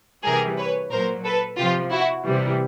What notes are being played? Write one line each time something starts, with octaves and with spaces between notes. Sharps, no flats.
C3 E3 G3 G#4 A#4
B4 C#5
A#2 F#3 A#4 C5
A4 B4
C3 F3 F4 G4
E4 F#4
C3 E3 G3